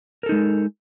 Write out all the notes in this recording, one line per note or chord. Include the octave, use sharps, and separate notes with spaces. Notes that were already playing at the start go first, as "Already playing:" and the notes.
G#3 D#4 A4 A#4